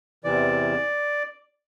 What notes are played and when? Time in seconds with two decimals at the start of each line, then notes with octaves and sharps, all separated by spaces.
0.24 E2 C3 E3 D5